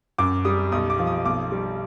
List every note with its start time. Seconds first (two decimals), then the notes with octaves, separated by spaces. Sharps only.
0.18 F#2 D6
0.45 G3 D#6
0.72 B1 D#6
0.90 D6
0.99 F3
1.07 D#6
1.25 B1 D6
1.52 G3